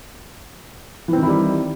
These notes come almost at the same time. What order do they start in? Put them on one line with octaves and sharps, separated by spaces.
E3 C4 D#3 E4 G3